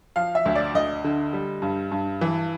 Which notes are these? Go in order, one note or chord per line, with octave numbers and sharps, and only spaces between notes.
F3 F5
E5
D2
D5
D2 D#5
D3
G3
G2
G2
E3